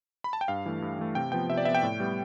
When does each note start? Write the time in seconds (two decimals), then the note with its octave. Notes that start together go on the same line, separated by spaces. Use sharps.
0.24 B5
0.33 A5
0.41 G5
0.48 G2 F5
0.66 E3 A3
0.82 G2
0.99 E3 A3
1.15 C3 G5
1.32 F3 B3 G5
1.49 C3 E5
1.58 D5
1.65 F3 B3 E5
1.75 G5
1.83 A2
2.00 G3 B3